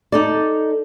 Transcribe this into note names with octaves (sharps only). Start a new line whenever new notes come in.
D#4 A4 D5